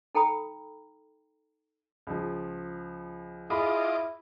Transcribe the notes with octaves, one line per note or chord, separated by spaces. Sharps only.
D#4 A4 G5 A#5 B5 D#6
C#2 F3
E4 F4 G#4 D#5 B5 D6